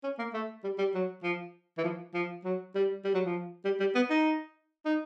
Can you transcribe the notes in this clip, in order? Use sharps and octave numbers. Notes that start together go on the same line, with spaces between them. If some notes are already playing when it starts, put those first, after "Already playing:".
C#4
A#3
A3
G3
G3
F#3
F3
E3
F3
F3
F#3
G3
G3
F#3
F3
G3
G3
B3
D#4
D#4